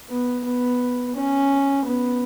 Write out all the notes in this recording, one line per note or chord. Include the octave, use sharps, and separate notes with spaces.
B3
B3
C#4
B3